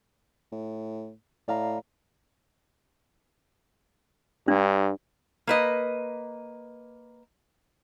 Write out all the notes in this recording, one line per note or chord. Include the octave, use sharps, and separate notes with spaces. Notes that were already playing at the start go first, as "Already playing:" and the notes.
A2
A2 D5 F5 A#5
G2 D4
A#3 B4 D#5